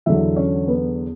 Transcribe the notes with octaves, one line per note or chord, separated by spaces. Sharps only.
E2 D3 F#3 E4 E5
C#4 C#5
B3 B4